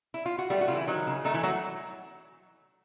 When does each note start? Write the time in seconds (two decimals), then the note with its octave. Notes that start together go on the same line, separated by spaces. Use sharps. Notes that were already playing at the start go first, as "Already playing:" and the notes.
0.14 E4
0.26 F4
0.38 F#4
0.50 G3 A3 G4
0.61 F#4
0.68 C#3 F4
0.75 E3 E4
0.87 D#3 F#3 D#4
1.07 C#3
1.24 D#3 A3 D#4
1.34 E3 E4
1.43 F#3 A3 F#4